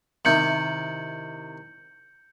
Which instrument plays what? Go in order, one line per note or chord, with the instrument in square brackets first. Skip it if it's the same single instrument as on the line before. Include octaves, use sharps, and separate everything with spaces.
[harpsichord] C3 D#3 E4 [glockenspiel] G6 C#7 F#7